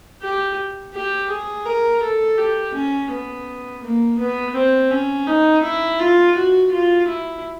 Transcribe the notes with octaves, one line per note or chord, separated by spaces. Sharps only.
G4
G4
G#4
A#4
A4
G4
C#4
B3
A#3
B3
C4
C#4
D#4
E4
F4
F#4
F4
E4